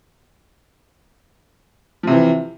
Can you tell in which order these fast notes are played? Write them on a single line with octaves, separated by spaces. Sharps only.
F3 C3 E3